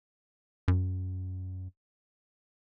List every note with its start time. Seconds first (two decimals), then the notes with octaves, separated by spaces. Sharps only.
0.68 F#2